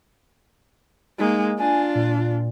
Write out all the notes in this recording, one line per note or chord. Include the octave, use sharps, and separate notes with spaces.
G#3 A#3 D#4
D4 F4 G#5
A#2